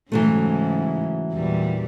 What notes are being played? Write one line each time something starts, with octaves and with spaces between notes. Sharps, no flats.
G#2 C#3 E3 F#3 A3
E2 A#2 G3